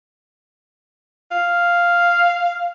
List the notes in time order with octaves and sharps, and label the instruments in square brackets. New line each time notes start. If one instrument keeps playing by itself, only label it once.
[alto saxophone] F5